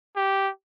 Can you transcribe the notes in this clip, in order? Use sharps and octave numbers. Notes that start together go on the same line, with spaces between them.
G4